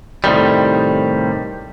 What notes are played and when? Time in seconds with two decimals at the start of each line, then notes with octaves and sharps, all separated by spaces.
0.24 A2 C3 D#3 G3